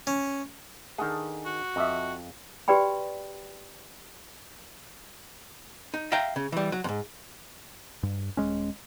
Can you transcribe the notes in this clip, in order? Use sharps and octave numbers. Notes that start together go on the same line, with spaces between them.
C#4
D#3 D4 G#4 A4 F#5
F#4
F2 D#5 E5
F#4 G4 B4 D5 G5 B5
D#4
E5 F5 G5 A#5
C#3
E3 G3
F#3
F2 G#2
G2
D#1 G#3 C#4